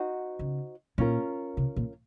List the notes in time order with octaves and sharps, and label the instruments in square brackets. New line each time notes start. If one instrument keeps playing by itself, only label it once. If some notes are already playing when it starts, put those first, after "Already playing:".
Already playing: [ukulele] D#4 F#4 C5 F#5
[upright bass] C#3
[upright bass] A#2 [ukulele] C#4 F4 A#4
[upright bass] C3
A#2